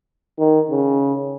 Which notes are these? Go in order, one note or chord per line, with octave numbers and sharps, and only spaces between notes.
D#3
C#3